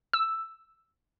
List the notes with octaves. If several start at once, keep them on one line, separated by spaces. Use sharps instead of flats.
E6